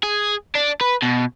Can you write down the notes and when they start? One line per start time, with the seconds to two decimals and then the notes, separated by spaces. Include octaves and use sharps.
0.03 G#4
0.55 D4
0.81 B4
1.02 B2